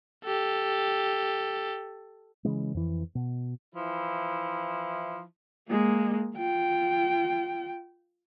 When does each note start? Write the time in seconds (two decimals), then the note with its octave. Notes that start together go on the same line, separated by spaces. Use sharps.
0.25 G4 A4
2.45 C#3 E3 G#3
2.74 F2 E3
3.15 B2
3.75 E3 F3 E4
5.69 G#3 A#3
6.35 F4 G5